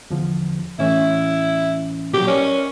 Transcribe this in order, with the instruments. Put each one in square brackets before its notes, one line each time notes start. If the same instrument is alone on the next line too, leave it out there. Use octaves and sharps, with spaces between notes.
[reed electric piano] E2 D3 F3
[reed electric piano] A2 E3 C#4 [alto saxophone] E4
[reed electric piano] A#2 F#3 [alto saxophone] G4
[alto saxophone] C#4 [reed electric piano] A#4 D5